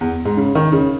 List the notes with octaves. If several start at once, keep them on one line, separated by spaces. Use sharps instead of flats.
E2
G#2
C#3
D#3
C#3